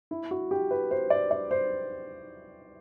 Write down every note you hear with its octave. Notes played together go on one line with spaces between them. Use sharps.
E4
F#4
G4
B4
C5
D5
D5
C5